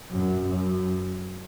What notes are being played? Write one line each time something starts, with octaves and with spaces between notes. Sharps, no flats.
F#2
F#2